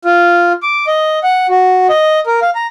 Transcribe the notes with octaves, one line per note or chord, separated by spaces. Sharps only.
F4
D6
D#5
F#5
F#4
D#5
A#4
F5
A#5